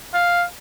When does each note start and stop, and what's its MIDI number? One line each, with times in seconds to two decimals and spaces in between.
0.14 0.43 77